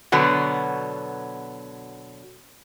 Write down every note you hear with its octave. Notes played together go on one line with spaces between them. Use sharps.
B2 D3 F#3 B3